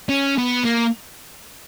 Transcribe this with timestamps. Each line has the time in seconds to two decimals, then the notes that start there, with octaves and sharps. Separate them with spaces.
0.09 C#4
0.38 B3
0.65 A#3